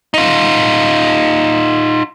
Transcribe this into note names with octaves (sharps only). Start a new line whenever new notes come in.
D#4 F4